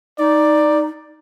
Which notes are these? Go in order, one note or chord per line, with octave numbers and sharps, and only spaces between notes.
D#4 D5